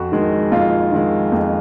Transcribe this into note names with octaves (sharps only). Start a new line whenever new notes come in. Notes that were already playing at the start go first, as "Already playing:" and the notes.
Already playing: F2 F#4
D#3 G#3
F2 F4
D#3 G#3
F2